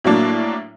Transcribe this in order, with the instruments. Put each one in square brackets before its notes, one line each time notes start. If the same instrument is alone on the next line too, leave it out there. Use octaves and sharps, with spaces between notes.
[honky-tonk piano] A2 F#3 A#3 D4